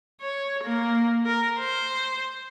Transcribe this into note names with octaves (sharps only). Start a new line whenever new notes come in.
C#5
A#3
A#4
C5